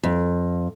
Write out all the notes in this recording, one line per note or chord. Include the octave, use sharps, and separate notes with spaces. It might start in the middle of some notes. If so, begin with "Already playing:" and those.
F2